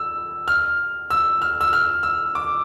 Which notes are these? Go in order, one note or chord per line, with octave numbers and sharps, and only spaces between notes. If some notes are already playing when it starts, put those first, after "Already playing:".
Already playing: E6
F6
E6
F6
E6
F6
E6
D6